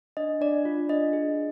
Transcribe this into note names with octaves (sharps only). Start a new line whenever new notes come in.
D4 D#5
D4 D5
F4
D4 D#5
G#4